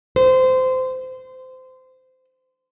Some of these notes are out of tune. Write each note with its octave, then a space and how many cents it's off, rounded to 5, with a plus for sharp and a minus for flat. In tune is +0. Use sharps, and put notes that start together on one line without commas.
C5 -20